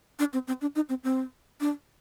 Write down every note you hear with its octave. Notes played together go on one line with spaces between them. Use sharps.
D4
C4
C4
D4
D#4
C4
C4
D4